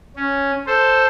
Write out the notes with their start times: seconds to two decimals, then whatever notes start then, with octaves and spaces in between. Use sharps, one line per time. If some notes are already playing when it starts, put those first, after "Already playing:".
0.16 C#4
0.66 A4 C5